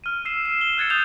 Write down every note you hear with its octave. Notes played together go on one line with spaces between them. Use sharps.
F6 D#7
E6 C7 E7
D#7 E7
G7
E6 F#6 G#6 A6 C#7
D#6 G6 F7